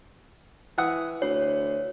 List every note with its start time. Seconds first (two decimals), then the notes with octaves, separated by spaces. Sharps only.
0.78 E3 F#5 D#6
1.22 D2 C#5